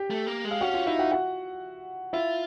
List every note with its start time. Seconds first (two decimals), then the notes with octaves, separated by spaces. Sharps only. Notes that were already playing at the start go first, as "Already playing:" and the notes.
Already playing: G4 G5
0.10 A3
0.27 A#3
0.45 G#3
0.51 F5
0.61 C#4 F#4 F#5
0.74 F4 F5
0.86 D#4 E4 E5
0.99 F#4 F#5
1.12 F#4 F#5
2.13 E4 F4 E5